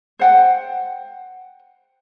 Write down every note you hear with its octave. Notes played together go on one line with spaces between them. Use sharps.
C5 F#5 G5